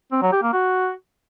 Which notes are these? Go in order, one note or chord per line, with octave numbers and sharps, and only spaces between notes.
C4
F#3
G4
A#3
F#4